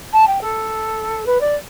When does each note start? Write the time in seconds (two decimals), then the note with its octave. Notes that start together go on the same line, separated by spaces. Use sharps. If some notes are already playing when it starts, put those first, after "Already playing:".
0.13 A5
0.27 G5
0.41 A4
1.26 B4
1.40 D5